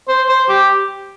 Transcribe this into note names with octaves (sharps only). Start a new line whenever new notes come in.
C5
C5
G4